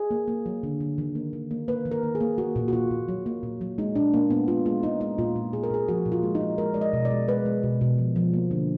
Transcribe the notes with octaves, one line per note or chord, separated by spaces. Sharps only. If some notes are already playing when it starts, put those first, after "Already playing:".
Already playing: G#4
A#3
A#3
F#3
D3
D3
D#3
A#3
D#3
A#3
A#3 B4
D#3
A#4
A#3
G#4
A#3
A#3 F#4
A#2
F#4
A#2 F4
A#2
F#3
A#3
A#2
F#3
G#3 D#4
A#2 D4
A#2 A#3
A#2 B3
G#3 F4
G#3 F4
G#3 D#4
G#3 D#4
A#2 F4
A#2
A#2 G#4
A#4
A#2 G#4
F3 F#4
A#2
F4
G#3
D#4
G#3
G#3 A#4
G#3 D5
D#5
B2
D5
G#3
G#3 B4
G#3
B2
B2
F3
F3
A#3
D3